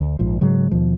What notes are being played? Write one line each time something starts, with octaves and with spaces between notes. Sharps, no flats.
D2
A#1 G#2 F3
G#2 C#3 F#3 G#3
D#2 B2 F3